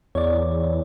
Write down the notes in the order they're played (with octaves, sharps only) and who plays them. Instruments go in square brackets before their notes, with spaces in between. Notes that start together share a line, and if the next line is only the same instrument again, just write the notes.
[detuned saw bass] E2 [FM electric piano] C#5 D5